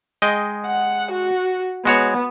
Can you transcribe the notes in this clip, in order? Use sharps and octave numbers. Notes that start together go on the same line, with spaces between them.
G#3 D#5 G5
F#5
F#4
G#3 B3 F#4 C#5